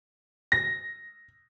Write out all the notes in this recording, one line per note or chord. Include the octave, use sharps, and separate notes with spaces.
A#6